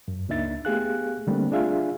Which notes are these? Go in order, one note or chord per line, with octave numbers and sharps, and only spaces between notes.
F#2
C#2 A#3 D4 D#4 E5 A6
A3 B3 G4 G#4 F5 F#6
D3 G3 A3 A#3 C4 D4
D4 F4 G#4 E5 F5